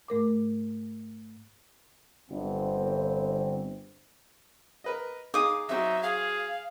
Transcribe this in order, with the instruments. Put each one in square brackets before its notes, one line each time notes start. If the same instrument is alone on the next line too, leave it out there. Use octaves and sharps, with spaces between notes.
[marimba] G#2 A3 A#4 D6
[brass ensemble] G1 C4
[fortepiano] A#4 B4 D#5
[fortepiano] D#4 G#4 F5 [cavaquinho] D6 D#6
[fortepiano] F#3 C4 F#4 [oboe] D#4 [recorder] E5
[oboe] G#4 [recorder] F5